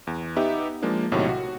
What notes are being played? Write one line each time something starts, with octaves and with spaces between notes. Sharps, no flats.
E2
B3 D#4 G4 E5
F3 G#3 A#3 D4
B1 A2 C3 D#3 F#4 C#5
F#4